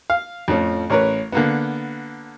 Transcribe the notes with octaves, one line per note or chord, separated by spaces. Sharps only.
F5
F2 A2 F3 C#4
A1 C#4 A#4 B4 C#5
D3 A#3 B3